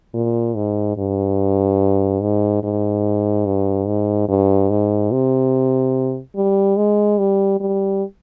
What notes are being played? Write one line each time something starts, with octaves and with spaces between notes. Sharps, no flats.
A#2
G#2
G2
G#2
G#2
G2
G#2
G2
G#2
C3
G3
G#3
G3
G3